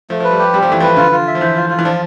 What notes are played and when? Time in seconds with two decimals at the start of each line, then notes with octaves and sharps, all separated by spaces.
0.10 F3 A3
0.20 F3 B4
0.31 G3
0.39 G4
0.54 G3 C4
0.62 F3
0.68 E3 A3
0.80 F3 B4
0.97 D3 F4
1.12 F4
1.27 E5
1.35 F3
1.41 E3 C5
1.56 F4
1.70 F4
1.79 E3
1.84 F3 D4